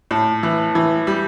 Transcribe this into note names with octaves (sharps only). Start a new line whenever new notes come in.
A2
E3
E3
G3